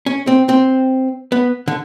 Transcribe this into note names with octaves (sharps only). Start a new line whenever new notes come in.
C#4
C4
C4
B3
D3